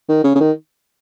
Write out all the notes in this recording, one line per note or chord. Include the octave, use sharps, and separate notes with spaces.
D#3
C#3
C#3
D#3